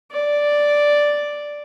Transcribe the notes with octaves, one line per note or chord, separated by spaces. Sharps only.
D5